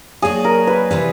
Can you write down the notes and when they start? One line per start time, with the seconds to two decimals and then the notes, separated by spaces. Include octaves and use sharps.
0.22 F#3 A#3 D4 F#4 G#4
0.45 A#4
0.67 B4
0.91 C3 E3 G3 B4